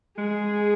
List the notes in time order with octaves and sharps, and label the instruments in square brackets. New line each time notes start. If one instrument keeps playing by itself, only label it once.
[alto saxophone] G#3 [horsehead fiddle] G#4